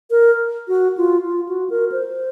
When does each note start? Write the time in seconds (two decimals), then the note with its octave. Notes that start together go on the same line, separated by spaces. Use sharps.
0.11 A#4
0.68 F#4
0.97 F4
1.26 F4
1.49 F#4
1.70 A#4
1.92 C5